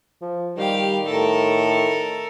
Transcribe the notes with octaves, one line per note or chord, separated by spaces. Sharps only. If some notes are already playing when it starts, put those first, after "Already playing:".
F3
D#3 G3 G4 F5
A2 A4 A#4